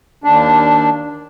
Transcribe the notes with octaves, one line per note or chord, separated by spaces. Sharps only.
D#2 D4